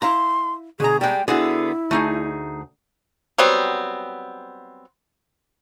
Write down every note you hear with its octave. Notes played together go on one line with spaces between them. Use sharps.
E4 F5 A#5 C6
B2 D3 G#4 A#5
G3 G#3 G5
D3 B3 E4 F#4 G#4
D2 A3 D#4 G#4
F#3 G3 B3 C4